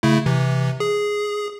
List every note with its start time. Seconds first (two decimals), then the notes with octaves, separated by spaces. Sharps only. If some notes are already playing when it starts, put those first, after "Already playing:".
0.03 C#3 A3 E4
0.26 C3 E3
0.80 G#4